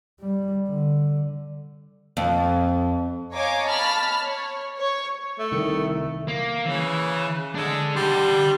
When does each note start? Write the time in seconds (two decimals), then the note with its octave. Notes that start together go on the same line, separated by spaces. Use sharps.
0.20 G3
0.68 D3
2.17 F2
3.33 C#5 D#5 F5 G#5 A#5 D6
3.66 A5 B5 F6
4.21 C#5
4.76 C#5 C#6
5.39 A3
5.52 C2 D#3 C#7
6.28 A#3
6.65 C#3 E3
7.55 G#3 D4 A4
7.96 D3 G3 C6